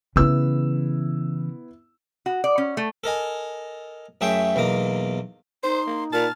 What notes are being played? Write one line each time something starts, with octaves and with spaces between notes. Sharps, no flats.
C#3 E3 B3 E4 E6
F#4
D5
C#4
A3
A4 A#4 D#5 G#5
F#2 A3 G#4 E5 G5 C6
B1 E2 A#3 D#5
D#4 C5 C6
A#3
A#2 A5 F6